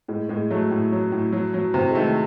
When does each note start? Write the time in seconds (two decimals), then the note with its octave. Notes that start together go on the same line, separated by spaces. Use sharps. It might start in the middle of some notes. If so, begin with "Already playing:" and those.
0.08 A2 G#3
0.29 A2 G#3
0.50 F#3 A3
0.71 A2
0.92 F#3
1.12 A2
1.33 F#3
1.54 F#3
1.74 C3
1.91 G#3
1.95 D#3 A3